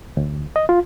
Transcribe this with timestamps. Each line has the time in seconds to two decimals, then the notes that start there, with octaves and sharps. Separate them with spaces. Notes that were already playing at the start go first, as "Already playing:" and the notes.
0.17 D2
0.56 D#5
0.69 F4